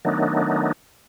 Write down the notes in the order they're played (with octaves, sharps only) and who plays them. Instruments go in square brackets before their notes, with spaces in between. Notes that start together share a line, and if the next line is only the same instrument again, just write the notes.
[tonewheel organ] D#3 F#3 A3 B3 D4 D#4